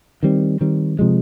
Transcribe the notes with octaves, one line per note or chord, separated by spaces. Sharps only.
D#3 G3 C4
D#3 G3 C4
C3 F3 G#3